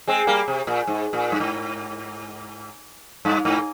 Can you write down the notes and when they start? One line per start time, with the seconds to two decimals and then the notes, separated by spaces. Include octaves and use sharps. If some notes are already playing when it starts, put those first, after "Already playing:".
0.08 G#3 C4
0.27 G3 A#3
0.48 C3
0.67 A#2
0.87 G#2
1.13 A#2
1.32 G2
1.40 G#2
3.25 G2
3.45 G#2